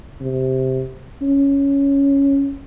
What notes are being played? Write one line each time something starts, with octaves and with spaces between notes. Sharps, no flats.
C3
C#4